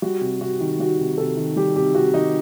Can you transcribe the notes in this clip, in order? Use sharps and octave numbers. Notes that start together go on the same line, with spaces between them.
G3 F#4
C3
C3 F#4
D#3
G3 F#4
C3
C3 A4
D#3
G3 G4
C3 G4
C3 F#4
D#3 D#4